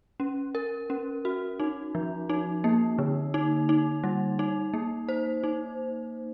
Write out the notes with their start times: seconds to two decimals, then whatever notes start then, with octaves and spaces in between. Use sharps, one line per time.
0.20 C#4
0.55 A#4
0.90 C#4
1.25 F#4
1.60 D#4
1.95 F3
2.30 D#4
2.64 A#3
2.99 D3
3.34 D#4
3.69 D#4
4.04 G3
4.39 D#4
4.74 A#3
5.09 C5
5.44 D#4